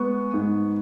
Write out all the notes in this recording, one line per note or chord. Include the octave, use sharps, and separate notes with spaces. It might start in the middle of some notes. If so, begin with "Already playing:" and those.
Already playing: G#3 B3 C#6
G#2